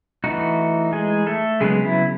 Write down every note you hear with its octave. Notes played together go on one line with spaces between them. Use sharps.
E3 A3 D#4 F#4
G#3 G#4
A3 A4
C#3 F#3 G#3 B3 G#4
E4